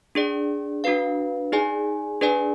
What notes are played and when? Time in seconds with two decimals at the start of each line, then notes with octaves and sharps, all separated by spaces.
0.15 D4 G#4 D5
0.84 D4 F#4 B4 F5
1.52 D#4 G#4 D5 G#5
2.21 D4 G#4 B4 D5 G#5